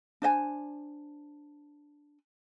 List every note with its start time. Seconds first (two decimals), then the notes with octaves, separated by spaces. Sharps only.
0.22 D4 C5 D#5 G#5